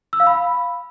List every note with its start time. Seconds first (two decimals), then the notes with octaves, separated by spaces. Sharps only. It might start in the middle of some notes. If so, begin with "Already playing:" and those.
0.13 E6
0.20 F5
0.27 B5